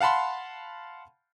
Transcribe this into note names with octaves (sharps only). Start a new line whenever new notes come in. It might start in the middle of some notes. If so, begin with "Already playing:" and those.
F5 F#5 A5 B5 C6